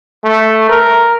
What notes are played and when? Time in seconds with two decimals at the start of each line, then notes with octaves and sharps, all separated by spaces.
0.24 A3
0.69 A#4